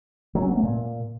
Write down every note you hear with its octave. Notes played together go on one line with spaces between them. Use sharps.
F#3
C#4
B3
A3
A#2